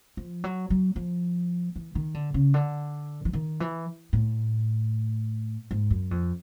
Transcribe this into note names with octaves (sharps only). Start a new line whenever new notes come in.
F3
F#3
F#3
F3
E3
D#3
D3
C#3
D3
E3
D#3
E3
A2
G#2
F#2
F2